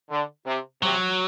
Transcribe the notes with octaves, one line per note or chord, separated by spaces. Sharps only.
D3
C3
C3 F#3